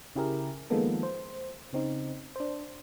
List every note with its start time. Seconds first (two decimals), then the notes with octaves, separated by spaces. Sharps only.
0.15 C#3 E4 G4 G#4 A#4
0.70 D#3 F3 G#3 A#3 B3 A4
1.03 C5
1.73 C#3 C4 D#4
2.36 D4 C5